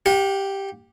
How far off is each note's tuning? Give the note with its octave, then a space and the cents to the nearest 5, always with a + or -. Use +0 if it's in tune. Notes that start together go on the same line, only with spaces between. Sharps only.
G4 +0 F#5 -40